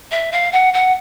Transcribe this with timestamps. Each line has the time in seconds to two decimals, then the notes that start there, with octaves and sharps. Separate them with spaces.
0.11 E5
0.32 F5
0.52 F#5
0.74 F#5